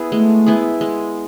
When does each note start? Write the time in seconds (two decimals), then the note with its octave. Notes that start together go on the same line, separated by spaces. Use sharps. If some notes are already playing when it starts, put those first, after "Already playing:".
Already playing: B3 E4 G#4
0.11 G#3 A3
0.46 B3 E4 G#4
0.81 G#3